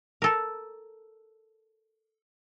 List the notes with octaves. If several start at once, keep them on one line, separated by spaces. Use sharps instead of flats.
A4 A#4